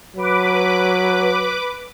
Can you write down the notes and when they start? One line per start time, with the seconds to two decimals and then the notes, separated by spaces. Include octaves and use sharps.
0.16 F#3 B4 D6